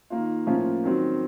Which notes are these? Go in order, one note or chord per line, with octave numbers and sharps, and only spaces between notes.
D#3 A#3 F4
A2 F3 A#3 C#4 F4
D#3 F#3 C4